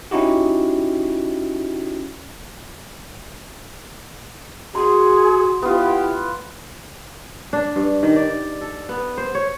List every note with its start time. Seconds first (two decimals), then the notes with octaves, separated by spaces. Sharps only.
0.11 C#4 D#4 E4 F#4 G4
4.75 F#4 G#4 C6
5.63 B3 E4 F4 G4
7.53 D4
7.76 G2
8.03 D#3
8.16 D5
8.61 A4
8.89 B3
9.18 C5
9.35 C#5